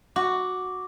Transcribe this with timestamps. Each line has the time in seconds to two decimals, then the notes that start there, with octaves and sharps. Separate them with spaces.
0.16 F#4 D6